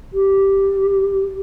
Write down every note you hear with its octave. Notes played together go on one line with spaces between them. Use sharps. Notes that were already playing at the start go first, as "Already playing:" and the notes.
G4